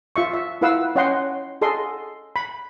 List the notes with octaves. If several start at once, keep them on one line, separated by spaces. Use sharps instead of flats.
F4 E5 C#6
E5
E4 F4 B4 F5 F#5 E6
C#4 C#5 D#5 F#5 G5 C6
G#4 A4 D#5 C6
B5